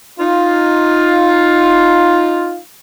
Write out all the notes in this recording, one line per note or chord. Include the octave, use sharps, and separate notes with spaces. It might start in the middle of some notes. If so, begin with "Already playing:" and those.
D#4 F4